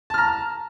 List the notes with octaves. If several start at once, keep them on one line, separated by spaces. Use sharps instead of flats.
A5 A#5 F6